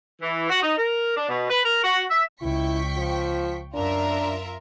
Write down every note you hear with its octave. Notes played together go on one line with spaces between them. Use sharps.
E3
F#4
D#4
A#4
D4
B2
B4
A#4
F#4
E5
C#2 E4 G5 C#6 B6
F3
F#2 D4 F4 A#4 E5